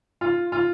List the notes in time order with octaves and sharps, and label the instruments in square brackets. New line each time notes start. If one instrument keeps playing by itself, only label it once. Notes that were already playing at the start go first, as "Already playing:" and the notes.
[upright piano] F4
F4